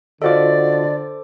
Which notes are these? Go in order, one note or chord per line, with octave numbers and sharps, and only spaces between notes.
D3 F4 F#4 A4 C5 D5 D#5 D6